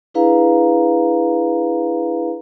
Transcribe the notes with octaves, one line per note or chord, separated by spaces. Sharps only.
D4 E4 G#4 B4 F5 A#5